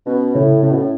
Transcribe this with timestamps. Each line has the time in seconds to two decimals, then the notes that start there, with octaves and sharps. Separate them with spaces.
0.07 B2 C#4
0.35 A2 C#3
0.63 A2 C#4
0.71 B2
0.77 A2